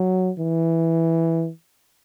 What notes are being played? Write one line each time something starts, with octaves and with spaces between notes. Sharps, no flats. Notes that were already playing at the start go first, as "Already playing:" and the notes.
Already playing: F#3
E3